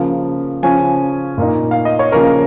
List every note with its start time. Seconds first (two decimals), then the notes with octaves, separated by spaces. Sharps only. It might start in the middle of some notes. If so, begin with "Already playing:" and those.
Already playing: C#3 F3 A#3
0.63 C#3 F3 C#4 G#5
1.38 A#2 A#3 D#4
1.71 F5
1.85 D#5
1.99 C#5
2.12 C#3 F3 A#3 C#4 A#4